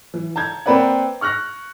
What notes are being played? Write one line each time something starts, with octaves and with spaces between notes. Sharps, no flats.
E3
A5 A#5 G6 G#6
A#3 C4 A#4 B4 D5 F#5
C#6 F6 F#6 A#6